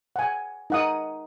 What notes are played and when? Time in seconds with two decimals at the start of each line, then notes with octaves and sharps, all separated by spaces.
0.16 F#5 G#5
0.70 D#4 F#5 D#6